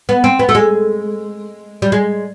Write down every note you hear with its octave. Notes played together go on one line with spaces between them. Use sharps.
B3
C4
B3
A3
G#3
G3
G#3